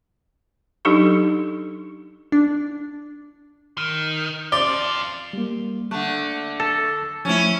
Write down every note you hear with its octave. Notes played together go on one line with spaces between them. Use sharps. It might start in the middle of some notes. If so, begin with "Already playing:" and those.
F#3 D4 D#4 G4 A4 C#6
D4
D#3
F2 F4 D5
G3 A#3
D3 A3 F#6
A4 A6 A#6
F3 A3 C#4 E4